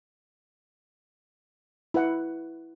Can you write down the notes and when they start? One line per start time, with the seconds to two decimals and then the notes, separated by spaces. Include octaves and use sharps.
1.94 E4 B4 F#5